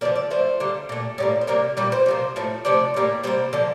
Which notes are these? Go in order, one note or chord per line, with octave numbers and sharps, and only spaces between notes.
D3 F3 A#3 D5
D5
D3 F3 A3 C5
D3 G3 A#3
A#2 A3
A2 G3 A#3
C5
C3 G3 A#3 A#4
A#2 G3 A#3 D5
C5
C3 F3 A#3
A2 F3 A3
C3 F3 A3 D5
A2 G3 A#3
C3 G3 A#3 C5
D3 F3 A#3